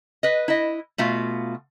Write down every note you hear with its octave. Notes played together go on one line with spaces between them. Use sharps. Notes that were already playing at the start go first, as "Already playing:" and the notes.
B4 D#5
E4 D#5
B2 A3 F4 F5